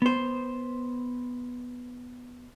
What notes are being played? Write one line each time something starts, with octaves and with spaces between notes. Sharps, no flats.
B3 C5